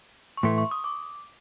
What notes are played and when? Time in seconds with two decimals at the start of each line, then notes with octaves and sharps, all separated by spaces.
0.37 C#6
0.43 A2 E3 A3 C6
0.58 C#6
0.71 D#6
0.84 D6